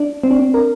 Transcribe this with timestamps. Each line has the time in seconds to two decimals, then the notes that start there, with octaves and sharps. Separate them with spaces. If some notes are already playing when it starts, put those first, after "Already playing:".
Already playing: D4
0.23 C4
0.31 D4
0.39 C4
0.54 A#4